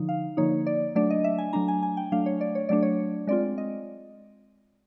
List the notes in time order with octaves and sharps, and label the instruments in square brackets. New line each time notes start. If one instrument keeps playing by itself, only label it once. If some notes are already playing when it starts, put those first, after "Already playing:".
Already playing: [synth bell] D3 F3 D#4
F5
D3 F3 A#3 D#4 C#5
D5
F#3 A3 D4 D5
D#5
E5
G#5
F#3 A3 D4 A#5
G#5
G#5
G5
F#3 A3 D4 F5
C#5
D5
C#5
F#3 A3 D4 D5
C#5
G#3 C4 F4 D5
D#5